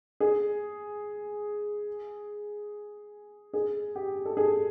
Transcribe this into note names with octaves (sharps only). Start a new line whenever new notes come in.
G#4
G#4
G4
A4
G#4